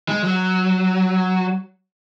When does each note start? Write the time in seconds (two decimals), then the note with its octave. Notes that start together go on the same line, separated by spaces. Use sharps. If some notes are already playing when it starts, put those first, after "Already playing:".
0.09 G#3
0.24 F#3